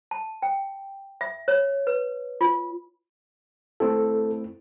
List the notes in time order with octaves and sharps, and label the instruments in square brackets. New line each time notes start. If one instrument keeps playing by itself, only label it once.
[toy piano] A5
G5
E5
C#5
B4
F4
[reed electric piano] A3 C4 E4 [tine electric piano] A4